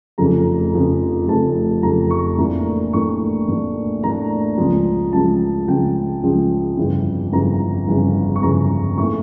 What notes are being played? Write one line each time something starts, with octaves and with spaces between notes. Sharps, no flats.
F1 F2 C#3 F3 A3 A#5
F1 F2 C#3 F3 A3
F1 F2 C#3 F3 A3 A5
F1 F2 C#3 F3 A3 A#5
C#6
A2 E3 A#3 D4 A#5
A2 E3 A#3 D4 C#6
A2 E3 A#3 D4
A2 E3 A#3 D4 A#5
C#2 C#3 F3
C#2 C#3 F3 A5
C#2 C#3 F3 G5
C#2 C#3 F3
G1 F2 C#3 E3
G1 F2 C#3 E3 A#5
G1 F2 C#3 E3
C#6
G1 F2 C#3 E3 A#5
A2 E3 A#3 E4 C#6